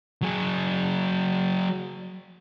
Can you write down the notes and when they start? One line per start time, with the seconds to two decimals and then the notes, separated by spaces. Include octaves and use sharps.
0.22 F#3 G#4